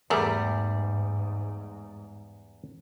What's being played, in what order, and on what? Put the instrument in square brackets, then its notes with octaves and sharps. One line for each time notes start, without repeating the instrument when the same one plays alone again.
[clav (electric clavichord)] E2 G3 [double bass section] G#2 [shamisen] A3 G#4 A#4